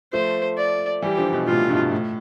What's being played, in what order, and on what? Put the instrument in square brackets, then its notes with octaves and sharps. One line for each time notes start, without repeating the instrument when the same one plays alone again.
[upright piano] F3 A3 [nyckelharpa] C5
[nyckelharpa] D5
[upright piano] E3 G3 [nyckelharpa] G4
[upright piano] D3 F3
B2 D3
[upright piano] A2 C3 [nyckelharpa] F4
[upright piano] G2 B2
A2